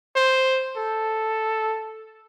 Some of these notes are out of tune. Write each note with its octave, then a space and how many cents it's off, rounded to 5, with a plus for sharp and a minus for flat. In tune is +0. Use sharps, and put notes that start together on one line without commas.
C5 +0
A4 +0